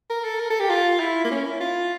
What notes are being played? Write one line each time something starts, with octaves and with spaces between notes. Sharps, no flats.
A#4
A4
A#4
A4
G4
F4
E4
A#3
C#4
E4
F4